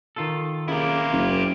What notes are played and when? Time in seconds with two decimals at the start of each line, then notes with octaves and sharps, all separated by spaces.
0.16 D#3 F4 A4
0.68 C#3 A#3 E4 G4
1.12 F#1